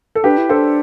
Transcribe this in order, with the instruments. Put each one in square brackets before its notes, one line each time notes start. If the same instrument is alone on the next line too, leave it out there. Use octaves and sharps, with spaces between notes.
[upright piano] A4
[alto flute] D4 [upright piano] G4 B4
[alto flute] E4
[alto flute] D4 [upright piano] A4 C5